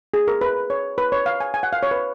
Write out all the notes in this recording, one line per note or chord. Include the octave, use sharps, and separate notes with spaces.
G#4
A#4
B4
C#5
B4
C#5
F5
G#5
G#5
F#5
F5
C#5
B4